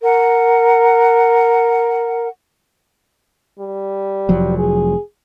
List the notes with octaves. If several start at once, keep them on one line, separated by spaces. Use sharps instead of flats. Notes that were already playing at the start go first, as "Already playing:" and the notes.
A#4 F#5
G3
F1 F3 F#3
G#4